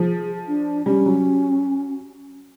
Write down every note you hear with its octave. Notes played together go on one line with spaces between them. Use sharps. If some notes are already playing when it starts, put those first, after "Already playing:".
Already playing: F3 G#4
D4
G3 C#4
F#3